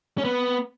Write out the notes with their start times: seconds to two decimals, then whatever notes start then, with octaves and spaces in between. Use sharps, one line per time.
0.18 C#4
0.24 B3